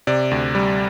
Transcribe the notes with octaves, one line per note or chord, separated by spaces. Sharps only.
C3 D5
D2
G3